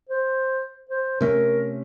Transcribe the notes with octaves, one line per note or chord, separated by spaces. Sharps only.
C5
C5
C3 A3 C#4 A#4